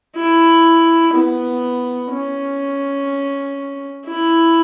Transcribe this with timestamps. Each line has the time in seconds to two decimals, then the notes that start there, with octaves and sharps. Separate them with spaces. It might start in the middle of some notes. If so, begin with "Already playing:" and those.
0.16 E4
1.13 B3
2.11 C#4
4.06 E4